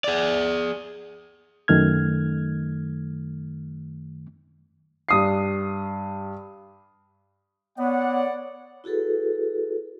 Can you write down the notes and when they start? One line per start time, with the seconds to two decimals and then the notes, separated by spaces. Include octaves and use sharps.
0.04 G#4 D5
1.68 F#2 D#3 A3 F6 G#6
5.09 G2 D#6 C7
7.79 B3 C#5 D5 F#5
8.84 E4 F#4 G#4 A4 B4